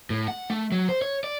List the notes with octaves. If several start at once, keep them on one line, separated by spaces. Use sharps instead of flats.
A2
F#5
A3
F#3
C5
C#5
D5